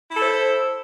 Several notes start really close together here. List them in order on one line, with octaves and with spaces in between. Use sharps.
E4 A4 C5